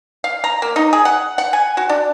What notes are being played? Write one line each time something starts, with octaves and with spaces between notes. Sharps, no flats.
F5
A#5
A#3
D#4
G#4
F#5
F#5
G#5
F#4
D4